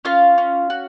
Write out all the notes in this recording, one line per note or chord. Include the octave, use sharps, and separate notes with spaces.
C#4 F4 F5
C#4
F#4